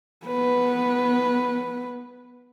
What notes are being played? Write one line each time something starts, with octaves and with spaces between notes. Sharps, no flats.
B3 B4